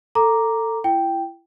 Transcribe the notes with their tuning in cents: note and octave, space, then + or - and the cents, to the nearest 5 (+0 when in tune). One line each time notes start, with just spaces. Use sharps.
A4 +20 A#5 +0 D6 +0
E4 +30 G5 +0